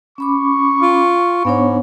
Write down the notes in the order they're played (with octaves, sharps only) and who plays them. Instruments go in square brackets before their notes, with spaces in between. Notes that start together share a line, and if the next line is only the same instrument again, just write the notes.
[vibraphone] C#4 B5 D6 [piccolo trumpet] C#6
[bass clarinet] F4
[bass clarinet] G#2 [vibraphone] B3 D4 C#5